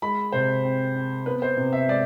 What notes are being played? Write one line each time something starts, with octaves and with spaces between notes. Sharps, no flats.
G#3 B5
C3 C5
C4
C4
B3 B4
C5
C3
E5
G#3 D5